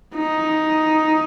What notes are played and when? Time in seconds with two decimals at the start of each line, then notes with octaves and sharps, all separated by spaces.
0.16 D#4